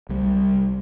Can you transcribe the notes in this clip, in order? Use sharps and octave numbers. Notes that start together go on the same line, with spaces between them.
C2 G3